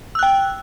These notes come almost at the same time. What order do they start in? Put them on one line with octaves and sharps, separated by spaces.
E6 F#6 G5